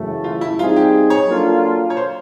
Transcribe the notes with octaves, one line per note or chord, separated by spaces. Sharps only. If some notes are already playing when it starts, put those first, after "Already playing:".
Already playing: F#2 C#3 E3 A3
F4
E4
G3 C4 D#4 F4 G#4
G4
C#5
F#3 A#3 D4 F4 A4
C#5
C5